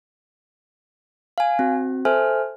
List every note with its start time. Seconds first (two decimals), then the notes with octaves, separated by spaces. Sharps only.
1.38 F5 G#5
1.59 C4 F#4
2.05 A4 C5 E5 G#5 F6